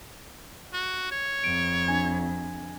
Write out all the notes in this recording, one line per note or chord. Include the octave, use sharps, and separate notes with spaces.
F#4
C#5
F2 D7
D4 G#5 G#6